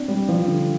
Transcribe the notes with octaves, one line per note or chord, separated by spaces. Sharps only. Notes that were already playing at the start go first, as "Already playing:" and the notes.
Already playing: C4 D4
G3
F3
D3